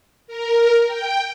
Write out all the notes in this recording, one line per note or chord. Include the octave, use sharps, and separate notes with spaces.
A#4
G5